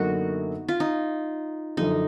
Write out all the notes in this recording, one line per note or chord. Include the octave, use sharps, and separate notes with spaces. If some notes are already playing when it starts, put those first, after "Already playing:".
Already playing: F#2 D3 F#3 A#3 B3 D#4 F#4
F4
D#4
F#2 D3 F3 D#4